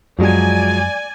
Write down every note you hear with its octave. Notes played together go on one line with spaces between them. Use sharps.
F#2 F3 F#3 G#3 D5 G#5